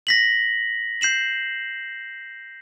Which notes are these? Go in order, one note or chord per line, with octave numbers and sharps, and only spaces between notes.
A#6 B6 F#7
G6 C7 E7 F#7